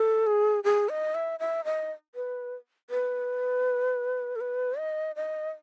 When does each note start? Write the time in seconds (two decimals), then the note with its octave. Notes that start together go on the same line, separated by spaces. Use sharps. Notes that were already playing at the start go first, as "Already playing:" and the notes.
Already playing: A4
0.26 G#4
0.64 G#4
0.89 D#5
1.14 E5
1.40 E5
1.65 D#5
2.15 B4
2.90 B4
4.36 A4
4.41 B4
4.78 D#5
5.16 D#5